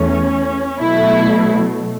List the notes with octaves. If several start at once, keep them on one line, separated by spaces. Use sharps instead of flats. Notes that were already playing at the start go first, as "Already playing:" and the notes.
Already playing: E2 E3 A3 C#4
B2 F#3 A3 E4